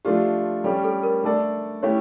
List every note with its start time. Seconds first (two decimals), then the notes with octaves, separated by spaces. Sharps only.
0.05 F3 A3 D4 F4 G4
0.64 G3 C#4 G4 A4
0.84 A4
1.03 A#4
1.23 A3 D4 A4 D5
1.83 A3 C#4 E4 G4 C#5